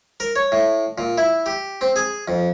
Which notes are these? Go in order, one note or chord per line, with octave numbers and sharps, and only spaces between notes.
A#4
C#5
A2
A#2
E4
G4
C4
G#4
F2